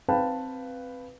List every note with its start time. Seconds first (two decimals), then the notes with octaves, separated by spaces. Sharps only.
0.08 C4 B4 F5 G5 A5